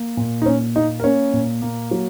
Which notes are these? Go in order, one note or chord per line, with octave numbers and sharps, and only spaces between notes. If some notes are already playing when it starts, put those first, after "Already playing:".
Already playing: A#3
A#2
D#4
A#2 C#4
A#3 D#4 D#5
A#4
A#3 C#4 C#5
A#2
A#3
F#3